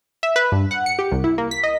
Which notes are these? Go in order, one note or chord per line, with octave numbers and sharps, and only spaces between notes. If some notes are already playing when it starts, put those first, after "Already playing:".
E5
B4
G2
F#5
C#7
G4
C2
E4
A#3
B6
D#5